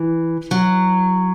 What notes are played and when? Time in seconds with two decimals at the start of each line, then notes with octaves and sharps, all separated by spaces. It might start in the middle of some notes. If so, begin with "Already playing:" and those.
Already playing: E3
0.51 F#3